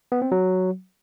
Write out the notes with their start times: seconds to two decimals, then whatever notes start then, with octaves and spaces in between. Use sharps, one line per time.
0.12 B3
0.22 C4
0.32 F#3